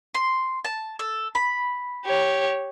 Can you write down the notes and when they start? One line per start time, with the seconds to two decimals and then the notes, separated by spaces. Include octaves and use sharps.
0.14 C6
0.65 A5
0.99 A4
1.35 B5
2.05 G4 C#5